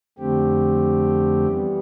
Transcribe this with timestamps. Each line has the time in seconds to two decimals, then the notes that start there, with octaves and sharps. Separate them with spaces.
0.18 F2 D3 A3 C4 G4
1.47 E3 G3 B3